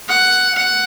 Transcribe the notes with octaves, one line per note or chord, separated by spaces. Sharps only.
F#5
F#5